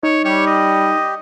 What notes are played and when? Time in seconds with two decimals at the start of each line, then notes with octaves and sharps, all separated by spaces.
0.03 D#4 C#5
0.25 G3 G4 C#5
0.47 D#5